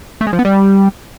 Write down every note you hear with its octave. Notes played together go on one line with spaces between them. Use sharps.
A3
G#3
F3
B3
G3